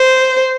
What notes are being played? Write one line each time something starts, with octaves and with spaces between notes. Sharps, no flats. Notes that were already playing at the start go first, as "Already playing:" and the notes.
Already playing: C5